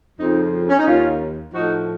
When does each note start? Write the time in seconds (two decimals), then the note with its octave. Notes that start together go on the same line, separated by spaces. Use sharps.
0.19 F2 C#3 F3 C4 D#4
0.69 C#4
0.78 D#4
0.86 D#2 D#3 C#4 F4
1.53 A2 F3 D#4 F#4